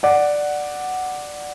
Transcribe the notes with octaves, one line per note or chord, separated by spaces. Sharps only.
D5 F#5